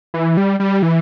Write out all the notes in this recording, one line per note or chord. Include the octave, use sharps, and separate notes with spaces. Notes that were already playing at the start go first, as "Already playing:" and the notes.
E3
G3
G3
E3